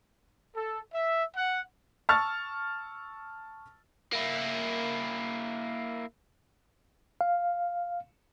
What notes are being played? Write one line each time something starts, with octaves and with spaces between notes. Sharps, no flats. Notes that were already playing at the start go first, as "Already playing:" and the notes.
A4
E5
F#5
A5 C#6 E6 F6 A6
A#3 E4
F5